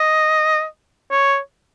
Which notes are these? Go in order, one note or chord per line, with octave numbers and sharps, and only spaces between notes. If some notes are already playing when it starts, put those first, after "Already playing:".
Already playing: D#5
C#5